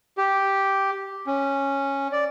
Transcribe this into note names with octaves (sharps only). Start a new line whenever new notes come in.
G4
C#4
D5